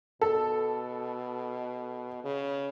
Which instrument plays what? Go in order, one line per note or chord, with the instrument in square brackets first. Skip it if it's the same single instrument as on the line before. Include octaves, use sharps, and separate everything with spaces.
[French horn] B2 [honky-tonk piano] A4
[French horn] C#3